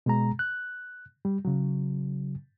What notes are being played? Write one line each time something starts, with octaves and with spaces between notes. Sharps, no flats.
B2 G#3 A#5
F#6
G3
C#3 F#3